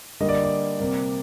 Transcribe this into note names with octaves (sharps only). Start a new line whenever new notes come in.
D3 G3 A#3 D#5
D5
D5
C3 G3 A#3